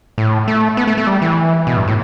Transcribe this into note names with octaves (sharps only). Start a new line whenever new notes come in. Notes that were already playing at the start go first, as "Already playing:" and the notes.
A2
A3
B3
A3
A3
G3
E3
B2
G2
A2